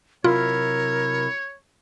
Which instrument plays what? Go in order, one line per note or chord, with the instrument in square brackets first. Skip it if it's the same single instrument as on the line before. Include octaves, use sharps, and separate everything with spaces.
[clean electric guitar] C3 F#3 E4 [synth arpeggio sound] F4 [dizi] A#4 [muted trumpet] C#5